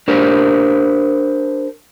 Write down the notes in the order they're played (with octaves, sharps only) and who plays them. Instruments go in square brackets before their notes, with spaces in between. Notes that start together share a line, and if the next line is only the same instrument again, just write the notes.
[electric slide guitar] D4 G4 A#4 C5